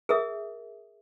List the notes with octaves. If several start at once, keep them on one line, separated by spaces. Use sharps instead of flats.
G#4 A#4 E5 D#6